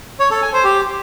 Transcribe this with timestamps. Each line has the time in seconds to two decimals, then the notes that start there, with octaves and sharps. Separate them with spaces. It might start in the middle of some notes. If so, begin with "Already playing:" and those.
0.19 C#5
0.31 A4
0.42 G#5
0.53 C5
0.64 G4